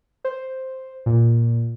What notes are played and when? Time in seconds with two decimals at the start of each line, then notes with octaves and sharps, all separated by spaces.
0.25 C5
1.06 A#2